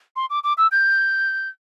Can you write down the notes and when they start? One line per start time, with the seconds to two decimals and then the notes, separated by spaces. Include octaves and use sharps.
0.16 C6
0.30 D6
0.44 D6
0.58 E6
0.72 G6